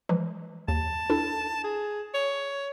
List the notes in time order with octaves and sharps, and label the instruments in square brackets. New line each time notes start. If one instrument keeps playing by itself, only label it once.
[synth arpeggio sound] E3 F3 G#3
[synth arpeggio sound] D#2 [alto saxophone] A5
[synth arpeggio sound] D4 E4 A4
[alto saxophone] G#4
C#5